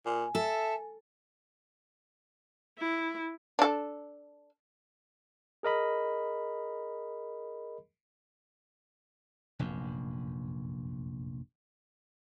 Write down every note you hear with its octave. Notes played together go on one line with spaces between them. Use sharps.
A#2 G#5
A4 E5
E4
D4 A4
G#4 A#4 D#5 B5
F1 A#1 F#2